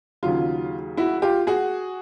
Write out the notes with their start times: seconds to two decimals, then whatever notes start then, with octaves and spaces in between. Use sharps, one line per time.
0.23 D#2 C#3 F#3 F4
0.97 E4 F#4
1.22 F4 G4
1.47 F#4 G#4